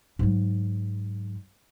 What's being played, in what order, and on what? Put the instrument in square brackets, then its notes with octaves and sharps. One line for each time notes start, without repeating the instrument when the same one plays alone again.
[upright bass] G#2 F#3